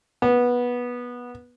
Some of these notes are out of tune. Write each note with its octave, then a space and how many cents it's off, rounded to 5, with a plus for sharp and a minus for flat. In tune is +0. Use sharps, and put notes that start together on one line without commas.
B3 -15